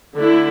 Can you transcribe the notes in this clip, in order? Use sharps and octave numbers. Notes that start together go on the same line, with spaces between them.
D3 A3 E4